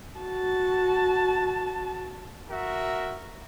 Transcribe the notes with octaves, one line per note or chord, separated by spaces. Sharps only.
F#4 A5
F#4 A#4 E5